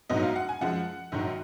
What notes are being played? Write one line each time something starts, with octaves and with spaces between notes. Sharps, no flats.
A#1 G#2 F#3 B3 D#5
F5
F#5
G#5
F#2 F3 G#3 F#5
A#1 G#2 D#3 F#3